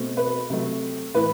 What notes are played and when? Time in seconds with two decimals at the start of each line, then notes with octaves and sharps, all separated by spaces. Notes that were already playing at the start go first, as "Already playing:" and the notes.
Already playing: B2 A3 C4
0.17 B4
0.50 C3 F#3 A3
1.15 A2 E3 B4